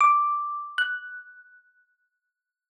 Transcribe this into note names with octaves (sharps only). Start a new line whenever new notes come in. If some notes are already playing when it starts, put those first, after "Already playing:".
D6
F#6